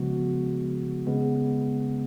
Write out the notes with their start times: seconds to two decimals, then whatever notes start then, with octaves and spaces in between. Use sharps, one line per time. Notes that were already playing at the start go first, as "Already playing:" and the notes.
Already playing: C#3 F3 G#3 B3 F#4
1.07 C#3 G#3 B3